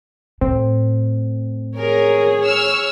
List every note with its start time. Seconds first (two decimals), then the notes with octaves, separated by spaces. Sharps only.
0.41 A2 C4
1.77 G#4 A#4 C#5
2.45 C#6 E6 F6